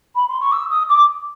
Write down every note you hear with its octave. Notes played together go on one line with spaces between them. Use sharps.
B5
C6
C#6
E6
D#6
D6